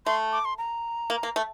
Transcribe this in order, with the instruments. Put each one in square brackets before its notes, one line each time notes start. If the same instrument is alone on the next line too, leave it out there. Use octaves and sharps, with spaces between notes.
[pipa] A3 [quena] C6
[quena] D6
C6
A#5
[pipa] A#3
A#3
A3